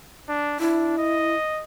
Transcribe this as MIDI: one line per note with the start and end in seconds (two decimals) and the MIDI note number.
0.29 0.57 62
0.60 0.95 62
0.60 1.34 64
0.98 1.64 75